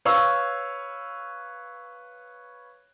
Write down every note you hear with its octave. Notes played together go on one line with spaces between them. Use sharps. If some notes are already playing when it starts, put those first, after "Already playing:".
B4 C#5 F5 C#6 E6